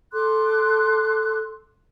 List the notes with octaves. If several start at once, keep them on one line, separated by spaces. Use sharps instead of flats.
A4 C6 D6 F#6